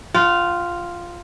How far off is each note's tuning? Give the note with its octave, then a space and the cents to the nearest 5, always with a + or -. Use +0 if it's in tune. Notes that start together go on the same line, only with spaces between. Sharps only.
F4 +0 F#5 +45